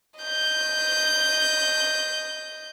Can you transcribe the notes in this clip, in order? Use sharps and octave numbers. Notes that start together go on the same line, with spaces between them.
D#5 G6